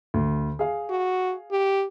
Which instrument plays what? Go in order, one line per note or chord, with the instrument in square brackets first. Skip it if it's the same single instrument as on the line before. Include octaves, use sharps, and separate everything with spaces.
[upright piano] D2
G#4 F5
[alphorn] F#4
G4